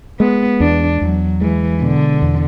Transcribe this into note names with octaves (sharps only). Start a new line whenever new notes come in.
G#3 B3
E2 D4
E2 F#3
E3 G#3
B2 D3
E2